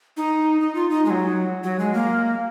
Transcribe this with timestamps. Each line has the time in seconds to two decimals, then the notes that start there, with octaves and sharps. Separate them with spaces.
0.17 D#4
0.60 D#4
0.75 F4
0.90 D#4
1.05 G#3
1.10 F#3
1.64 F#3
1.79 G#3
1.94 A#3